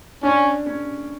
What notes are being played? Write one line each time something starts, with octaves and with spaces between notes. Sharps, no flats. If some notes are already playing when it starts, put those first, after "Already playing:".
C#4 D4
C#4